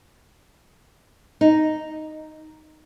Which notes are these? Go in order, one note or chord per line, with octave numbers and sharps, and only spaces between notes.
D#4